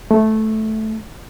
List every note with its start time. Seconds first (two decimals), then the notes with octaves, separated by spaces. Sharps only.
0.11 A3